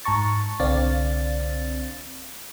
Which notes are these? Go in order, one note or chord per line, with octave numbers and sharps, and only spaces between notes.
G#2 A5 A#5 C#6 A6
C2 D3 C4 D5 F5 A6